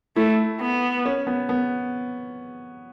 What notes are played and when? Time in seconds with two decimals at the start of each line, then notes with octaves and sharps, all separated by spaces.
0.16 A3 E4
0.60 B3
1.05 C#4
1.27 B3
1.49 B3